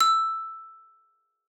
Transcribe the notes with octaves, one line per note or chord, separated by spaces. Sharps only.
E6